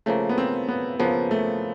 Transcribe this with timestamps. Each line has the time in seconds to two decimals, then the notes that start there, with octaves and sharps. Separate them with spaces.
0.06 C#3 F3 A3 A#3
0.29 B3
0.38 C4
0.68 B3
0.99 C#3 F3 A#3 B3
1.31 A3